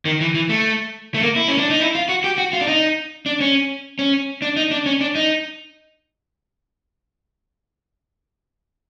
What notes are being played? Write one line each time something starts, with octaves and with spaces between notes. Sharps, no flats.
D#3
E3
E3
A3
A3
A#3
E4
C#4
D4
D#4
E4
F4
F#4
G4
F#4
F4
D4
D#4
D4
C#4
C#4
D4
D#4
D4
C#4
D4
D#4